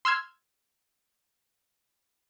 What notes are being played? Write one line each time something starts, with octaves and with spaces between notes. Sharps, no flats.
C6 E6 F6 G#6